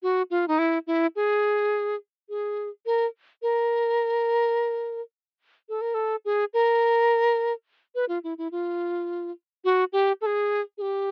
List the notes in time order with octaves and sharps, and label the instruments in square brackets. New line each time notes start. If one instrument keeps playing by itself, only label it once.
[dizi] F#4
F4
D#4
E4
E4
G#4
G#4
A#4
A#4
A4
A#4
A4
G#4
A#4
B4
F4
E4
E4
F4
F#4
G4
A4
G#4
G#4
G4